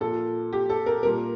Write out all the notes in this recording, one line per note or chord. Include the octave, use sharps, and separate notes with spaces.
A#2 F3 A4
G4
A4
A#4
A#2 G3 A#4